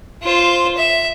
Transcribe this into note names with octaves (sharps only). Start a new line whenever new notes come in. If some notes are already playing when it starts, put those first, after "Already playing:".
F4 C5
E5